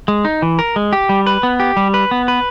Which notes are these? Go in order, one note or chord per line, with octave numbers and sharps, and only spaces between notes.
G#3
D#4
E3
A#4
G#3
G4
G3
B4
B3
G4
G3
B4
B3
B4